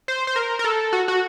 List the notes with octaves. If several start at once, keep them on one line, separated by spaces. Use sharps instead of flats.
C5
C5
A#4
A#4
A4
F#4
F#4